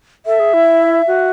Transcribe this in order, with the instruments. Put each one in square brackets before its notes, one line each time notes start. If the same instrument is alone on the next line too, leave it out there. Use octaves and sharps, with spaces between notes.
[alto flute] A4 [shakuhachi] E5
[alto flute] G#4
E4
F#4